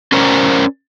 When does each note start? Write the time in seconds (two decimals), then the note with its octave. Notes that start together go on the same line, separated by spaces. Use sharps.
0.12 C#4 A#4 C5 D5 A#5